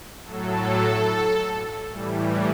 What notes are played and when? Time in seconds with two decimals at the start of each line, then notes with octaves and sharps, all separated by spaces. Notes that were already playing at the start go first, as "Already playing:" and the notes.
0.24 A2 F#3 A4
1.90 A2 E3 G3